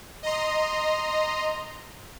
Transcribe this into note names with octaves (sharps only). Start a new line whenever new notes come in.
D#5 A#5 C6